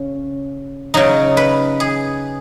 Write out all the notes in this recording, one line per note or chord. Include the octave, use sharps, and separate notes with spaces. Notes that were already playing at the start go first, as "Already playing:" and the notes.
Already playing: C#3 C#4
C#3 F#3 D#4
B4
G#4